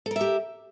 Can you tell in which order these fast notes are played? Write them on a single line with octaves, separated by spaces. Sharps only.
A4 A#4 E5 G4